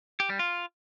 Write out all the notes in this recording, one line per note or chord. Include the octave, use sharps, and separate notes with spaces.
G4
G3
F4